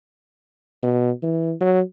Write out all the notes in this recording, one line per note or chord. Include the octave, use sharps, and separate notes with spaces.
B2
E3
F#3